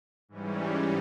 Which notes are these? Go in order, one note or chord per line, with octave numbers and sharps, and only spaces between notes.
G#2 E3 G3 C#4